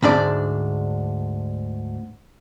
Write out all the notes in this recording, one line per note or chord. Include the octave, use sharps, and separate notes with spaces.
D2 G#2 D4 D5